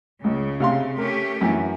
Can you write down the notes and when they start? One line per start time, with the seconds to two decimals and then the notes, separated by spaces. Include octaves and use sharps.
0.24 C#2 C#3
0.60 C3 F5 C6
0.98 A3 C#4 G4 A#4
1.41 F#2 E3